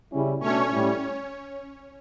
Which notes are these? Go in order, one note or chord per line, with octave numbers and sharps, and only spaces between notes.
C#3 G3 C#4 E4
B2 A3 C#4 D4 C#5
A2 G3 C#4 E4